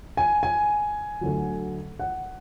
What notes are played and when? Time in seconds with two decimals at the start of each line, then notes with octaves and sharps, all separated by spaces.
0.17 G#5
0.43 G#5
1.21 D2 D3 F#3
2.00 F#5